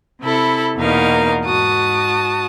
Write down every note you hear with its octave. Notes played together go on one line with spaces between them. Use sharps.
C3 E4 A4 B5
E2 B2 A#3 D#4 A#4 F5
G#2 F#4 A5 D#6